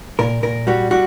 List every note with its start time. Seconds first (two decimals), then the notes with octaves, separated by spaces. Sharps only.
0.19 A#2 A#4
0.43 A#2 A#4
0.67 G3 F#4
0.91 G3 F#4